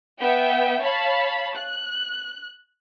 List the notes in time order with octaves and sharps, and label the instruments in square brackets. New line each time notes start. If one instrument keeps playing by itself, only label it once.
[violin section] B3 E5 G5
C#5 F5 A5 B5
F#6